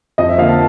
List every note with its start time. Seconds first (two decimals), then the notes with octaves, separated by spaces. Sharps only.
0.18 F2 D#5
0.29 E5
0.38 D3 F3 A#3 F5
0.49 A5